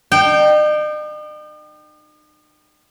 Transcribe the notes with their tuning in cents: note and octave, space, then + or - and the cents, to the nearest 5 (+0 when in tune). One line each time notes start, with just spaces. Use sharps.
D#4 -45 G5 -15